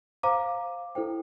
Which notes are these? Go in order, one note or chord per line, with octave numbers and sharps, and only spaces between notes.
C5 F5 A#5 D6
E4 A4 C5 G5